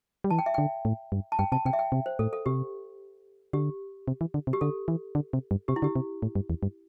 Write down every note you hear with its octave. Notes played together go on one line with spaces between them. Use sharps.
G3
E3 A5
G5
E5
D3 G5
A2
G2
A5
G2 G5
C3 A5
C3 G5
E5
G5
C3
C5
A2 A4
A4
C3 G4
D3 G4
C3
E3
D3
C3
G4
D3 A4
E3
D3
C3
G2
C3 G4
E4
D3 G4
C3
A2
G2
E2
G2